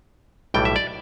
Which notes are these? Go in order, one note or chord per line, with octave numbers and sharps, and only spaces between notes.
B1 A2 E3 G3 G5
E5
D5